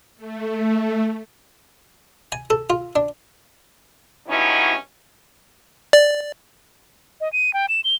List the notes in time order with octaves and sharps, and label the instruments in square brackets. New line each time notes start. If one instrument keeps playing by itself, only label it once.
[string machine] A3
[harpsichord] G#5
A4
F4
D4
[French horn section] G2 B2 F#3 C#4 D#4 E4
[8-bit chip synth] D5
[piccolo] D#5
D#7
G5
E7
G7